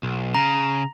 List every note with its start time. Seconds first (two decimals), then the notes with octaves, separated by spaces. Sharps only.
0.03 B1
0.35 C#3 A#5